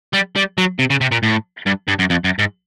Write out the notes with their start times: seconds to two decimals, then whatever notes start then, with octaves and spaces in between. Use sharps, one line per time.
0.13 G3
0.36 G3
0.58 F#3
0.79 C3
0.90 C#3
1.01 C3
1.12 A#2
1.23 A2
1.66 G2
1.88 G2
1.99 F#2
2.10 F2
2.24 F#2
2.39 G#2